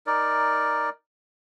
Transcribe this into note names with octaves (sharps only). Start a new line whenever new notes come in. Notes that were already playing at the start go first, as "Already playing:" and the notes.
D#4 A#4 D5